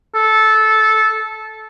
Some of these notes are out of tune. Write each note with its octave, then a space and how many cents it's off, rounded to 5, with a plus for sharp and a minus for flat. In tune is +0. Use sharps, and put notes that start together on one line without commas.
A4 -15